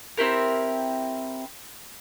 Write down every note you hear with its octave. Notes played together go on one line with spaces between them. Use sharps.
C4 E4 G4 A#4